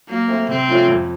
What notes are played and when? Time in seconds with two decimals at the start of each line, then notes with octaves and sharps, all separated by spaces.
0.09 F#3 A#3
0.28 A3 C4
0.49 C3 C4
0.68 F3 A3 C#4 F4
0.89 F2